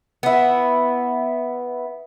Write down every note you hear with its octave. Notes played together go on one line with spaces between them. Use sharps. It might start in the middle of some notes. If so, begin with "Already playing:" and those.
B3 E4